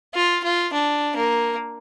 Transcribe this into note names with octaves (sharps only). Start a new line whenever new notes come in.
F4
F4
D4
A#3